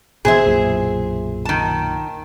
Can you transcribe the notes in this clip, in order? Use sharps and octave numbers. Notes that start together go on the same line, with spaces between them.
A#1 B2 E3 G#4 C5 E5
B1 F#2 A#2
D#3 A5